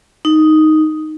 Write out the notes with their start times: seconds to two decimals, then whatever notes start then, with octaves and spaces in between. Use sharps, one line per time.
0.25 D#4